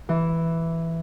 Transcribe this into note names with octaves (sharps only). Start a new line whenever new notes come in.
E3